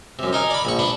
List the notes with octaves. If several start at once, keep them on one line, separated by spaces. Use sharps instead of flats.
F#2 C3
D#4 A#4 G#5
D5 B5
A#1 C#6
D4 B4